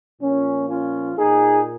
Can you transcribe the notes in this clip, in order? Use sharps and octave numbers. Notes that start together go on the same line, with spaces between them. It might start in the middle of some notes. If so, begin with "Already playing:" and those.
A#2 F3 A#3 C#4
C#4 F4
A#2 A#3 D#4 G#4